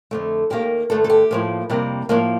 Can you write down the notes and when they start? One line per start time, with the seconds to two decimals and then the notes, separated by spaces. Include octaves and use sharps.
0.11 F2 D3 A3
0.50 D#2 D#3 G3 A#3 G4
0.90 G2 D3 A3 A4
1.04 A4
1.10 G4
1.31 A2 F3 A#3
1.70 F2 C3 G3 A#3
2.09 A2 F3 A#3 D4